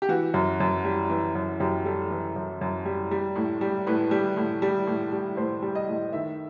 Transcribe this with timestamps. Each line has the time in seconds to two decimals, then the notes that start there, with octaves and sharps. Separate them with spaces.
0.02 G4
0.09 E3 F#4
0.34 F#2
0.60 F#2
0.85 G3
1.09 E3
1.35 F#2
1.60 F#2 G4
1.85 G3 A4
2.10 E3
2.36 F#2
2.61 F#2
2.85 G3
3.11 G3
3.36 A2
3.61 G3
3.87 A2 B4
4.11 G3
4.37 A2
4.62 G3
4.87 A2
5.12 G3
5.37 A2 C5
5.62 G3
5.75 D#5
5.87 A2
6.13 D#3 E5